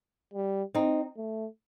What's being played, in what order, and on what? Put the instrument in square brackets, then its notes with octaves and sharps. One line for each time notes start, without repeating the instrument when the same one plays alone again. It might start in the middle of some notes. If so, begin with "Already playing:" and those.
[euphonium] G3
[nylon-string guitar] C4 D#4
[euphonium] A3